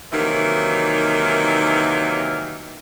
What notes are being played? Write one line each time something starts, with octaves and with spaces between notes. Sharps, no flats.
C3 D#3 E3 F#3 A#3 D#4